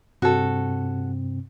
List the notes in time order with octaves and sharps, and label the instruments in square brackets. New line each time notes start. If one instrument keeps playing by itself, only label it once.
[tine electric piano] G2 C3 C4 [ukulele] F#4 A4